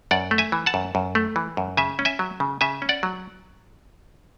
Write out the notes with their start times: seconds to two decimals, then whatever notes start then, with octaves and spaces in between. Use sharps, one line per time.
0.11 F#2 D5 F#5
0.31 A3
0.38 E5 G#5
0.52 E3
0.66 F#5 A5
0.74 F#2
0.95 F#2
1.15 A3
1.36 E3
1.57 F#2
1.77 C#3 E5 G#5
1.99 C#4
2.05 E5 G#5
2.19 F#3
2.40 C#3
2.61 C#3 E5 G#5
2.82 C#4
2.89 D5 F#5
3.03 F#3